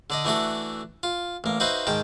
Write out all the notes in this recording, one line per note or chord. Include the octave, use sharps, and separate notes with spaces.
D3 D5 D#5
E3 A3 D4 F#4 A4
F4
A1 A#3
D#4 F#4 B4 C5 E5 F5
G#2 D#3 G5 A5